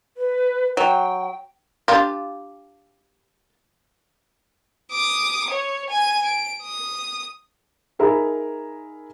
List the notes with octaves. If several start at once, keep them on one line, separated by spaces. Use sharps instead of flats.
B4
F#3 G5
D4 F4 G4
D6 D#6
C#5
G#5 D#7
D7
D#6
D#4 G#4 A#4 E5 A#5 B5